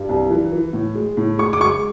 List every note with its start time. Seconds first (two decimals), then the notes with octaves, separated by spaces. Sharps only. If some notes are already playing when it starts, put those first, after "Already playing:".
Already playing: G2
0.09 C2
0.30 E3
0.52 E3
0.73 A2
0.95 G#3
1.17 A2
1.38 G#3 C#6
1.53 D6
1.60 G#3 C#6